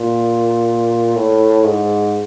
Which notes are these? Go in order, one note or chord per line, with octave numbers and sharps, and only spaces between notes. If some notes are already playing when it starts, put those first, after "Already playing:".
Already playing: A#2
A2
G#2